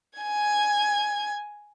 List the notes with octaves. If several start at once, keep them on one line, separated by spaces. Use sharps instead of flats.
G#5 G#6